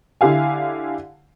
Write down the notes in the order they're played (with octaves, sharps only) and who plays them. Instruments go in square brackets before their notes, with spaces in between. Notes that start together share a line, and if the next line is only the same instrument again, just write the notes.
[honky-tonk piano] D3 E4 G4 F5 G#5